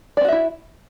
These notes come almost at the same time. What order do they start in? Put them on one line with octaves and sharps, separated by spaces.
D5 C4 F#4 E5 E4